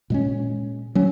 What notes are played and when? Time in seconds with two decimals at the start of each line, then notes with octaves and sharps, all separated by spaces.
0.10 A#2 G#3 C#4
0.95 F#3 C#4